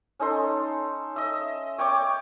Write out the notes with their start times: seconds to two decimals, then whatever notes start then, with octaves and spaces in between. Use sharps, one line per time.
0.19 C#4 D#4 A4 C6
1.16 D#5 E5
1.78 C#5 G5 C#6 D6